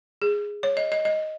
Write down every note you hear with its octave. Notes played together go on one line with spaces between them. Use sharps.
G#4
C#5
D#5
D#5
D#5